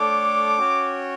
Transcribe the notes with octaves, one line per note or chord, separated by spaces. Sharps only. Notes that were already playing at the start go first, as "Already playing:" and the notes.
Already playing: A3 D4 A4 C#5 G5 D6
C#4 F#4 C#5 G5